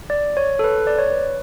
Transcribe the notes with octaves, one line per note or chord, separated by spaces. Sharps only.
D5
C#5
A4
B4
D5
C#5
B4